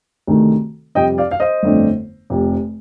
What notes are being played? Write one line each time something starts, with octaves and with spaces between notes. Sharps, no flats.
D2 C3 D#3 A3
F2 C3 G3 D#5 G5
D5 F5
F5
C5 D#5
G1 F2 D3 A3 D4
F1 F2 C3